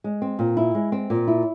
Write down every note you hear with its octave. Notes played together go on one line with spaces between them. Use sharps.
G#3
C4
A#2
E4
G#3
C4
A#2
E4